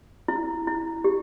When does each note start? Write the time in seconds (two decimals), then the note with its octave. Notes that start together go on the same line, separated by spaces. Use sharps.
0.28 E4
0.67 E4
1.04 G4